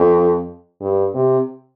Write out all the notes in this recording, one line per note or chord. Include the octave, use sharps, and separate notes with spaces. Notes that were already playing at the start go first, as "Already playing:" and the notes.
Already playing: F2
G2
C3